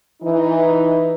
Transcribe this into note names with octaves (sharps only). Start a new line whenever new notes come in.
E3 D#4